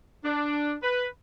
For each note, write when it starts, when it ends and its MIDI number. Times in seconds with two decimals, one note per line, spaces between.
0.24 0.73 62
0.83 1.06 71